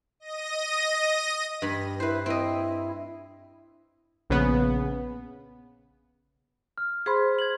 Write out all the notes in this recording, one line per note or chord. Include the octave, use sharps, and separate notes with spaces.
D#5 A#6 D#7
G2 B5
E4 B4 C5
C4 E4 D#5
A#1 C#3 B3
F6
G#4 C5 B5 C6 B6
G#6 F#7